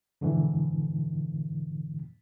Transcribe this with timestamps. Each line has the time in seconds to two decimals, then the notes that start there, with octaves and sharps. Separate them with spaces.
0.21 F2 G#2 B2 D3 E3